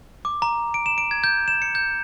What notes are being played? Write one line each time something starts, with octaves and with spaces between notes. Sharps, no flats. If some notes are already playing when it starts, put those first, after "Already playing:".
D6
A#5
D7
E7
D7
G#6
G6
E7
C#7
G6